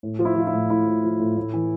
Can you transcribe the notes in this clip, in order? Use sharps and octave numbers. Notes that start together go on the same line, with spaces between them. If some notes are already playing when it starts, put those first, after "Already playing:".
A2
F3
E4
F3 F4
E4
A2
A2 E4
F3
F3
A2
A2
E3